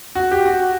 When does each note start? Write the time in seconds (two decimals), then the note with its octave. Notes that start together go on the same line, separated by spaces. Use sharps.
0.15 F#4
0.32 G4
0.45 F#4